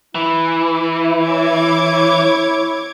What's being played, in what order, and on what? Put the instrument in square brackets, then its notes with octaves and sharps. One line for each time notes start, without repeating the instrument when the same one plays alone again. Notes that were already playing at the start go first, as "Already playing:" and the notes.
[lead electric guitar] E3 [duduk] E4
[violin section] C#5 D6 G#6